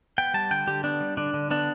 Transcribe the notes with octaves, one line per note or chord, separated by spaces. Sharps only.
B3 G5
G3 A5
D3 G5
D3 G4
B3 D4
G3
D3 D4
D3
B3 D4